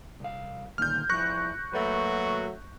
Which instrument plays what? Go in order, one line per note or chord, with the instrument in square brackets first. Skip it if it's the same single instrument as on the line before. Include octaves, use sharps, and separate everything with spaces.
[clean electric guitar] C2 F5
[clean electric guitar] D2 A#2 D#3 [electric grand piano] F6 G6
[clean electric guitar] F2 F3 E4 [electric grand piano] C#6 F#6 A#6
[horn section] F#3 A3 F#4 [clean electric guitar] A#3 B4